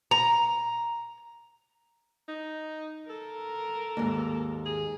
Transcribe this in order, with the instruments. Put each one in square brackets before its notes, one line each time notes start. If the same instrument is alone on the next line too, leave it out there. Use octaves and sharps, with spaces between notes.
[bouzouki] A#5
[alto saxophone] D#4
[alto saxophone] A4 [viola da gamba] A#4
[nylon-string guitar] D#2 G#2
[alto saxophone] G#4